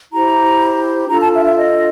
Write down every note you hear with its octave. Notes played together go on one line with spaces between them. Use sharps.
E4 G4 C5 A#5
D4 F4 A4 A#5
A5
E5
E5
D#5